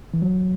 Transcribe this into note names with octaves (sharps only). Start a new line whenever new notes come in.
E3
F#3